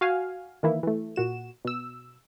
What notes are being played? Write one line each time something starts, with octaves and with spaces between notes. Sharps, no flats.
F#4 F5 G#5
D#3 E3 A#3 E4
E3 A3
A#2 F#4 E7
B2 E6